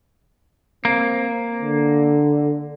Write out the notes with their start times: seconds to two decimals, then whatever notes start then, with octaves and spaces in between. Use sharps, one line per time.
0.85 A#3 C4
1.61 D3